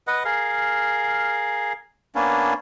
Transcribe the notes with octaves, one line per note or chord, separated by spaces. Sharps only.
B4 D#5 F#5
G#4 A#4 F5
A#3 B3 C#4 D4